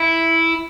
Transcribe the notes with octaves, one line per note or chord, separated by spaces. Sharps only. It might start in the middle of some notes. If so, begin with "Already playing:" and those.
Already playing: E4